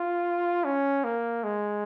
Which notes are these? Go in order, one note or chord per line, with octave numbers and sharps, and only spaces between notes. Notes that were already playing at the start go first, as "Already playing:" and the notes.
Already playing: F4
C#4
A#3
G#3